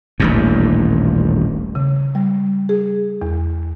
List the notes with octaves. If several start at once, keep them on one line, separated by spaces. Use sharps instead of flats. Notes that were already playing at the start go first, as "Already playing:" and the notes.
D#1 A1 G2
C#3
G3
G#4
E2